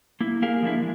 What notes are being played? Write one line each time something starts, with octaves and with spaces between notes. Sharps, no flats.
A#3 E4
A#3 G4 G#4 A#4 F5
F3 A#3 D4 E4
E3 G#3